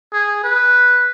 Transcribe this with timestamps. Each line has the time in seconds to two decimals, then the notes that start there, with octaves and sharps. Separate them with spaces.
0.13 G#4
0.44 B4